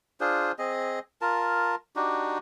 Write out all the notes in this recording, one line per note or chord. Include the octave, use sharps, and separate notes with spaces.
D4 F4 G#4 C5
C4 G#4 D#5
F4 A#4 A5
D4 D#4 F#4 G4